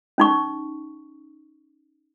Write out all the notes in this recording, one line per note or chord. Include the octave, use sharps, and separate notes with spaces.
C#4 D#4 C#6